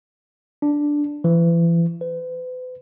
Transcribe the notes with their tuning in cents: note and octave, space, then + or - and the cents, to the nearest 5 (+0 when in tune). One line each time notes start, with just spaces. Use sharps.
D4 +0
E3 +35
B4 +40